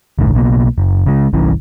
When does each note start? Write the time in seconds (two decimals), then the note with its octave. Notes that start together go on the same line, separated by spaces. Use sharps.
0.19 F#1 B1 A2 D3
0.34 B1 B2 A#3
0.78 F#1
1.06 C#3 G#3
1.33 G1 C2 E3 C#4